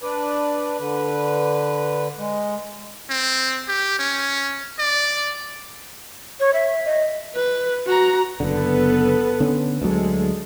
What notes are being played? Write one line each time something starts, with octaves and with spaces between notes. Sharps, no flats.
D4 B4 D5
D3 B4
G#3
C4
G4
C#4
D5
C#5
E5
D#5
B4
F#4 A#5
F#1 D3 B3 A4 B4
D3 B3 C#4
D2 F#3 G#3 A4